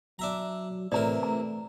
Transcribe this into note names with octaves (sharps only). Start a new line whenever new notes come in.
F#3 D4 E5 A#5
A2 C3 E3 A#4 D5 A#5
A3 A#5